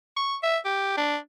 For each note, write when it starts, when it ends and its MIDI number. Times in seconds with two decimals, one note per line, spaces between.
0.17 0.36 85
0.43 0.58 76
0.65 0.94 67
0.97 1.17 62